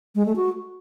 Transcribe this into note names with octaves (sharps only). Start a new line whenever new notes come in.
G#3
A3
F#4